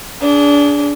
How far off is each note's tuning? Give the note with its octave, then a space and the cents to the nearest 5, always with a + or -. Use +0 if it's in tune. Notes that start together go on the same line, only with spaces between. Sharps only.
D4 -25 G#4 +0